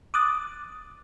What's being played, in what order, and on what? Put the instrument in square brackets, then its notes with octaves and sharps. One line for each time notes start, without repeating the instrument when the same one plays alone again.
[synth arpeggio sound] D6 D#6 F#6 A6